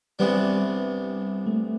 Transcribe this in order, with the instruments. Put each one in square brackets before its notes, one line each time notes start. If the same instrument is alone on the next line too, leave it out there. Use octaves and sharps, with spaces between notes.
[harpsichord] C2 C3 E3 B3 D4 [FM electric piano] G3
[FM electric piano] A3